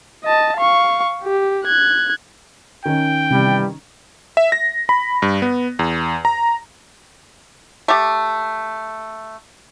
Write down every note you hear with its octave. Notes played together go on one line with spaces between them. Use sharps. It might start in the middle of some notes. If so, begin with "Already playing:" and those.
D#5 A5
F5 C#6
G4
F#6 G#6
D#3 C#4 G5
G2 C3 E3 G3
E5
A#6
B5
G2
B3
E2
A#5
A3 G4